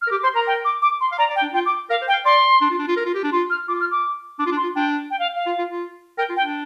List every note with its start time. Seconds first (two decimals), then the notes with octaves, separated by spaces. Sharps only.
0.02 F6
0.07 A#4
0.11 G4 D6
0.23 C5 C6
0.35 A#4 A#5
0.47 G5
0.65 D6
0.82 D6
1.01 C6
1.12 F5
1.18 D5 A#5
1.30 D5
1.36 G5
1.42 D4
1.54 F4 G5
1.66 D6
1.90 A#4 F5
2.02 C5
2.08 G5
2.13 F5
2.25 D5 C6
2.61 D4
2.70 F4
2.79 D4
2.88 F4
2.97 A#4
3.05 F4
3.15 G4
3.24 D4
3.32 F4 C6
3.50 F6
3.68 F4 D6
3.80 F6
3.91 D6
4.39 D4 D6
4.46 F4
4.52 D4
4.57 C6
4.63 F4
4.76 D4 G5
5.11 G5
5.19 F5
5.36 F5
5.47 F4
5.59 F4
5.70 F4
6.18 A#4 G5
6.30 F4
6.36 G5
6.41 D4